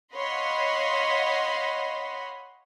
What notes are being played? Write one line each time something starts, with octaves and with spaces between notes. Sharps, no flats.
C#5 D#5 F5 F#5 B5 C6